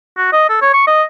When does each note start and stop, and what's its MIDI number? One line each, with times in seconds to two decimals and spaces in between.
0.17 0.31 66
0.32 0.44 75
0.49 0.59 69
0.62 0.71 73
0.73 0.82 85
0.87 1.03 75